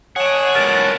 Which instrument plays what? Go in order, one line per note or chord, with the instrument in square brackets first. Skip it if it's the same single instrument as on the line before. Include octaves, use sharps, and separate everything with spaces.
[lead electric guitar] G#4 [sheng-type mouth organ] C#5 F#6 [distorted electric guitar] F#5 A5
[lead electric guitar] G#2 B2 [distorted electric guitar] B3 A#4 [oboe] A5